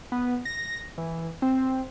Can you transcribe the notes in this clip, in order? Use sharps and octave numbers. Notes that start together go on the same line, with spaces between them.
B3
A#6
E3
C4